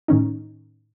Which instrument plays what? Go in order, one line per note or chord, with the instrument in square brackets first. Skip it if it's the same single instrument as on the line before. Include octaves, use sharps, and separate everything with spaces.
[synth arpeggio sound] A2 D#3 C#4 D#4